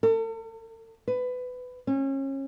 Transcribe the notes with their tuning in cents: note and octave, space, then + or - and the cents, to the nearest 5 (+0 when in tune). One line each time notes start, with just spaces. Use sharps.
A4 +45
B4 +20
C#4 -30